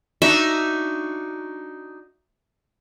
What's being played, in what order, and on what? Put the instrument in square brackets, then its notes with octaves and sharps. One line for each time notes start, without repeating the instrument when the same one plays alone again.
[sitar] D4 D#4 F#4 [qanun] E5